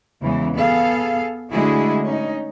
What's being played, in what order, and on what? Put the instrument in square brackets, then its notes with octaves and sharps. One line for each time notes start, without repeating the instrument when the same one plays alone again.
[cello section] E2 C#3 E3 G#3
B3 G#4 A4 F5
D3 G#3 A3 E4 F#4 G#4
C#4 D#4